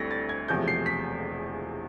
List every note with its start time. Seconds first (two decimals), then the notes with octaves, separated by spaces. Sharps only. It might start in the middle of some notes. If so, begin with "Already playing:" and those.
Already playing: D2 D3 G3 C4 E4 A#6 B6
0.11 A6
0.29 G#6
0.48 E1 E2 C3 F3 A3 G6
0.68 C7
0.86 B6